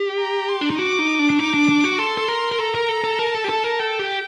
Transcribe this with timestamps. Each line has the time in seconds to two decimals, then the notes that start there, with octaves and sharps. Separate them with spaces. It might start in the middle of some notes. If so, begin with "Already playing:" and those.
Already playing: G4
0.19 A#5
0.49 C6
0.61 D4
0.70 D#4
0.79 F#4 D6
0.99 D#4
1.19 D4
1.30 D4
1.39 D#4 D6
1.54 D4
1.69 D4
1.84 F#4
1.98 A4 C6
2.18 A4
2.28 A#4
2.52 A#4
2.59 A4 A#5
2.75 A#4
2.89 A4
3.04 A4
3.19 A#4 A5
3.35 A4
3.44 G4
3.49 A4
3.64 A#4
3.79 A4 G5
3.99 G4